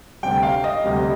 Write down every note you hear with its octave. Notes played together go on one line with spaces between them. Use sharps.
D2 C3 G3 G5
F5
D#5
D2 C3 G3